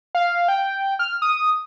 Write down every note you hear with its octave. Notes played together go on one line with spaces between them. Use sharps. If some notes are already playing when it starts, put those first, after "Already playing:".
F5
G5
F6
D#6